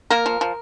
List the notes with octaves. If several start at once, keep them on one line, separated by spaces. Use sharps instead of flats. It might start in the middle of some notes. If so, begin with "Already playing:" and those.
A#3 A#4
F3
F3